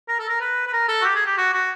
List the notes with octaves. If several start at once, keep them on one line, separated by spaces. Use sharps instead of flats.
A#4
A4
A#4
B4
B4
A#4
A4
F#4
G4
G#4
G4
F#4
F#4